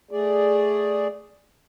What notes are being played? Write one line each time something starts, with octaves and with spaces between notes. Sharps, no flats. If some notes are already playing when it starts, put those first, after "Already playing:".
A3 G#4 D5